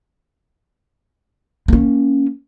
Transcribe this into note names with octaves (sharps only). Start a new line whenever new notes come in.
A#3 C#4